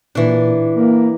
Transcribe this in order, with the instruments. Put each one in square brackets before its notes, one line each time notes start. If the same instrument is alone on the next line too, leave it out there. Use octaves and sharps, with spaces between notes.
[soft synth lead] A#2 [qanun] E3 D4
[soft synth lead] A#3